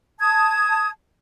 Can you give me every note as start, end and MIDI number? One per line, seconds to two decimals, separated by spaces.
0.19 0.89 81
0.19 0.89 87
0.19 0.89 92